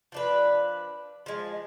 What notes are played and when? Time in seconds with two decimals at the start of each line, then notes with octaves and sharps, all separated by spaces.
0.12 F3 D4 B4
1.26 F3 G#3